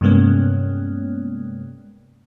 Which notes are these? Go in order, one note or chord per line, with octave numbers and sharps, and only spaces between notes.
G2 C3 G#3 A#3 B3 C#4